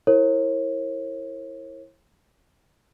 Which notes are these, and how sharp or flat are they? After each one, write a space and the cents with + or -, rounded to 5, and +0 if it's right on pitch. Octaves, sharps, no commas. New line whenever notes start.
E4 +0 A#4 -25 C#5 -45